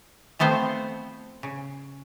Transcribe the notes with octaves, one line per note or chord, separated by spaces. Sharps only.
F3 A3 B3 C4 C5
C#3